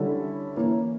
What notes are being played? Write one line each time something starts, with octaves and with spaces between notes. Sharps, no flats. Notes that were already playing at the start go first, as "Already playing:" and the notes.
Already playing: D3 G3 C#4 E4 A4
E3 A#3 C#4 E4